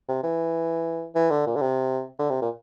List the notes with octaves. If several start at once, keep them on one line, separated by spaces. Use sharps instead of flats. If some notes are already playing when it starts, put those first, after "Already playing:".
C3
E3
E3
D3
A#2
D3
C3
D3
C3
A#2